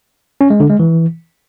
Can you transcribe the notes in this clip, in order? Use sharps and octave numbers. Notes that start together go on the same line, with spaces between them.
C#4
G#3
D3
G#3
E3